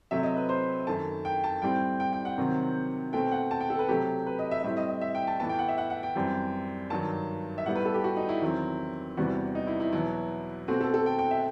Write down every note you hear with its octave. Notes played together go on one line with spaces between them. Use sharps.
C3 F#3 A3 C4 E5
D#5
B4
C5
F#2 D#3 A3 A5
G5
A5
A2 G3 C4 G5
G5
G5
F#5
C3 D#3 F#3 C4
B2 A3 C4 G5
F#5
A5
G5
A4
B4
C3 F#3 A3 G4
B4
D#5
E5
A2 G3 C4 E5
D#5
D#5
E5
G5
A5
A2 E3 B3 A5
G5
F#5
E5
F#5
F#5
G5
F#2 E3 G3 C4
G2 D#3 F#3 A5
E5
A2 G3 B3 F#5
B4
A4
G4
F#4
D#4
E4
E2 D#3 F#3 C4
E2 C3 E3 G3 B3 F#4
D#4
E4
E4
E2 B2 F#3 B3 E4
B2 A3 C4 F#4
A4
A4
G5
G5
E5